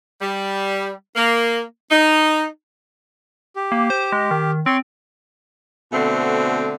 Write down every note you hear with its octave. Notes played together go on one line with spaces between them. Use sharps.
G3
A#3
D#4
G4
A#3
C5
G#3
D#3
C4 C#5 C6
B2 D3 A3 C4